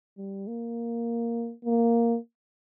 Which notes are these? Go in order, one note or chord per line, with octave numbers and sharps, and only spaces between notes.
G3
A#3
A#3